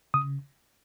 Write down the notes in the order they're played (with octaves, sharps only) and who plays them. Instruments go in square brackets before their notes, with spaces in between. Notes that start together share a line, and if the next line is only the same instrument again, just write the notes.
[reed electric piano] C#3 D#6